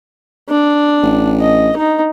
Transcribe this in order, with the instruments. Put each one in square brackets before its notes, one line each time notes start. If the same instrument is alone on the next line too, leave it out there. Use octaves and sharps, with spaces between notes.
[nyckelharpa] D4
[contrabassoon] A1
[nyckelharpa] D#5
D#4